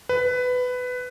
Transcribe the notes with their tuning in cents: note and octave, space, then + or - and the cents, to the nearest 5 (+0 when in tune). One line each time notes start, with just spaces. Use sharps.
B4 +15